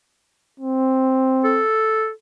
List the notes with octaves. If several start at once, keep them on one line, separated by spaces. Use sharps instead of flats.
C4
A4